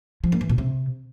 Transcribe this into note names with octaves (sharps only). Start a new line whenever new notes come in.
F3
A#3
E3
B2
C3